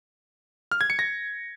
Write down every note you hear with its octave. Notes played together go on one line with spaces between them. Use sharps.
F6
G#6
C#7
A#6